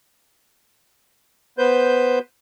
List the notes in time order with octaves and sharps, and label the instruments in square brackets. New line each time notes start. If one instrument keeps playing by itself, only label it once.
[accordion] B3 B4 C5 G6